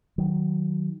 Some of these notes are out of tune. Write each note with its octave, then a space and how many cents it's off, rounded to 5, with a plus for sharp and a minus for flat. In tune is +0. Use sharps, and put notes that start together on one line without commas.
D#3 +0 F#3 +5